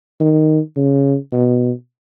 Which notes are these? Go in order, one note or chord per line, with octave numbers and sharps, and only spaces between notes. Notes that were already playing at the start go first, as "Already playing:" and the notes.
D#3
C#3
B2